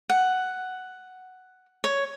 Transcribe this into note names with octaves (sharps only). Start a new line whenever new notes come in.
F#5
C#5